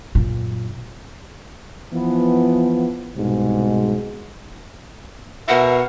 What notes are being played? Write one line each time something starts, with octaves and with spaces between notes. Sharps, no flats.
F#2 A#2
E3 F3 B3
C2 G#2 B2 G#3
B2 A#4 E5 F#5